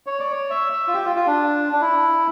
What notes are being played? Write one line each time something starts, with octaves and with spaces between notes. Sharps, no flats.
C#5
D5
C#5
E5
E5
F4
G4
F4
F4
D4
D4
E4